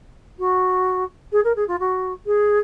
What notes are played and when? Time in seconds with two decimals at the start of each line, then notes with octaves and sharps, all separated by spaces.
0.39 F#4
1.32 G#4
1.44 A#4
1.56 G#4
1.68 F4
1.80 F#4
2.26 G#4